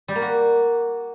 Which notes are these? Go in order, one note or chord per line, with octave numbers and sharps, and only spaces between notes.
G3
A#3
F#4